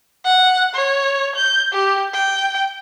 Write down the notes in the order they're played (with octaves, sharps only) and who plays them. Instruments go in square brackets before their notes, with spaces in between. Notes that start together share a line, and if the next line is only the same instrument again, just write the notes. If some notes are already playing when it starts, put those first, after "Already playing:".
[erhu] F#5
C#5
G6
G4
G5